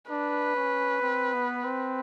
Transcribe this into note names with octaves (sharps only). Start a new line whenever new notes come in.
D4 B4
C#4
C4
B3
C4